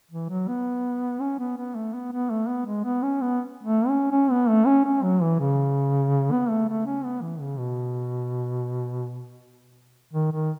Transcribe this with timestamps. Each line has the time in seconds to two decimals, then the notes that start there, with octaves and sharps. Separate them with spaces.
0.11 E3
0.29 F#3
0.48 B3
1.21 C#4
1.39 B3
1.57 B3
1.75 A3
1.93 B3
2.12 B3
2.30 A3
2.48 B3
2.66 G#3
2.84 B3
3.03 C#4
3.21 B3
3.63 A3
3.88 C#4
4.12 C#4
4.31 B3
4.49 A3
4.66 C#4
4.85 C#4
5.03 F#3
5.22 E3
5.40 C#3
6.32 B3
6.49 A3
6.68 A3
6.86 C#4
7.04 B3
7.22 E3
7.40 C#3
7.58 B2
10.13 D#3
10.32 D#3